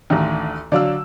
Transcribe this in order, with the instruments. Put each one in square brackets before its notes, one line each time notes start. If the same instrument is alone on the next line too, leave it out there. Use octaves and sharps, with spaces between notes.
[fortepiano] A1 D#3 [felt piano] D2
[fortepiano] D3 F#3 [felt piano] D5 F5 E6